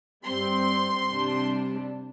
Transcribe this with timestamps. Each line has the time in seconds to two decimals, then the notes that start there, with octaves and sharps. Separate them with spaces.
0.25 G2 G3 C4 C6
1.11 C3 G3 D4